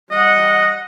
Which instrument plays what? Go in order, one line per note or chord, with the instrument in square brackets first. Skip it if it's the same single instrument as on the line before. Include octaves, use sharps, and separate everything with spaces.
[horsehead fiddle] G3 F#5 [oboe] D#5